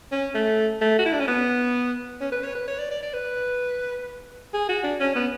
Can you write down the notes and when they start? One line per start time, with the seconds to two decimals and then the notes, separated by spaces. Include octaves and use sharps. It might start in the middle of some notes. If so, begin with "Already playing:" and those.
0.11 C#4
0.35 A3
0.81 A3
0.99 F#4
1.05 E4
1.13 D4
1.20 C#4
1.28 B3
2.21 C#4
2.32 B4
2.43 C#5
2.55 B4
2.67 C#5
2.79 D5
2.91 D5
3.02 D5
3.13 B4
4.54 G#4
4.69 F#4
4.84 D4
5.00 C#4
5.15 B3